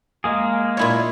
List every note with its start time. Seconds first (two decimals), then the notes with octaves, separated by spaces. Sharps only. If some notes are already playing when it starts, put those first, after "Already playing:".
0.24 G#3 A#3 G#4
0.77 A#2 E4 C#5